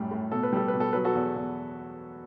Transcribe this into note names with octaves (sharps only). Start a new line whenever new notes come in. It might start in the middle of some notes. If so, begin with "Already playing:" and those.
Already playing: F#2 A2 G3
A2
B2 A4
B4
G3 A4
B4
B2
A4
F#3 B4
F#4 A4
E2
E2